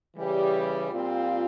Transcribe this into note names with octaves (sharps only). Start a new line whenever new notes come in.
C#3 E3 G3
A#2 G3 C4 F4